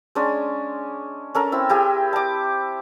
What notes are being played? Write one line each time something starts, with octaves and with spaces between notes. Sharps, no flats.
G#3 C#4 D4
C#4 A4 A#4
C4 E4 E6
E4 G4 G#4
A5 D6